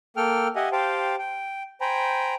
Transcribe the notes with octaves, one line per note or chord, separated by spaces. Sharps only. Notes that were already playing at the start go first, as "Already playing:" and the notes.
A#3 A4 G5 F6
G4 D#5 E5 F#5 G#5
G4 C5 F5 G5 A5
G5
C5 G5 G#5 A#5 B5